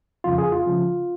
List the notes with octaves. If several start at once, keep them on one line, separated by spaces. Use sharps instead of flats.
F2 C#3 F3 C#4 F4
G#4
F4
C#3 F3 C#4